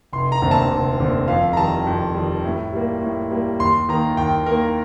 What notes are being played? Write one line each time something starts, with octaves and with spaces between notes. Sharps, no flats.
F1 C6
A#5
D#2 D3 A3 C4
A5
F1
D#2 D3 A3 C4
F2 F5
A#5
D#3 G3 A5
F2
D#3 G3
A2
G3 A#3
A2
G3 A#3
D#2 C6
D#3 A#3 A#5
D#2 G5
D#3 A#3 A#4